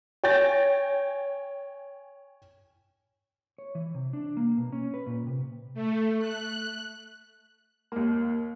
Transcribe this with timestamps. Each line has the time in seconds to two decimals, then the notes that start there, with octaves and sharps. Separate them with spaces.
0.24 C#5 G5 G#5 G6 A6 A#6
3.58 C#5
3.75 E3
3.95 C3
4.13 D4
4.37 A#3
4.57 B2
4.72 C#4
4.94 B4
5.07 A#2
5.27 C3
5.74 A3
6.19 F#6
7.92 D#2 A#3